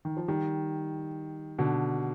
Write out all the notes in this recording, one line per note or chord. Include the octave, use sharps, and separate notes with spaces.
D#3
F3
D#3 G3
B2 D3